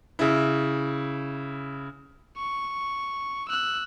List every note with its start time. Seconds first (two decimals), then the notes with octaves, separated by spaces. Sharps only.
0.19 C#3 E4
2.37 C#6
3.49 E6 F#6